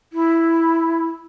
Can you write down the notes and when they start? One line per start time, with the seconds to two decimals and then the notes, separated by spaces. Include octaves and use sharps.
0.12 E4